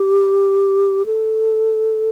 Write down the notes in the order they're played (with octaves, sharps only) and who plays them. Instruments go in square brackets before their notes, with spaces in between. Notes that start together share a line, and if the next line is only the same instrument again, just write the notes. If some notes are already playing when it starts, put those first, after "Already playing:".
Already playing: [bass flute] G4
A4